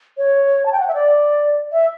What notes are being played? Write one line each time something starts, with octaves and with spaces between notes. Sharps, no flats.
C#5
A5
G5
F#5
E5
D5
E5